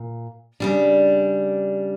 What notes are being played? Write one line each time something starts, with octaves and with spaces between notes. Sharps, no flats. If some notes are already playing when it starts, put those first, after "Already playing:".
Already playing: A#2
C#3 G3 D4